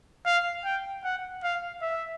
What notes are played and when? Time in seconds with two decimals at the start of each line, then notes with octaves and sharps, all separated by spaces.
0.26 F5
0.65 G5
1.04 F#5
1.43 F5
1.82 E5